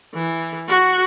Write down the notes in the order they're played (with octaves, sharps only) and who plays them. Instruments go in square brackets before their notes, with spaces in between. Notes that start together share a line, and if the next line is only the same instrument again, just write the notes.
[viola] E3
F#4